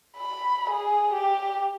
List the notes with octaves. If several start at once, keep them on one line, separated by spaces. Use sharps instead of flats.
B5
G#4
G4